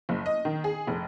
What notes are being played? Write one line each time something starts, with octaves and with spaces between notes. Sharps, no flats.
F#1
D#5
D#3
G#4
F1